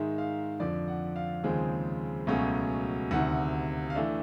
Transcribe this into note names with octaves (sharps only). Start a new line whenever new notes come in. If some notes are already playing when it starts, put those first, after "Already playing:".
Already playing: G#2 D#3 G#3 E5
F5
F2 D3 F3 D5
F#5
F5
D#2 C#3 F3 G#3 C4
C#2 B2 F#3 A3 C#4
D2 C3 D#3 F#5
F5
E3 A3 D4 E5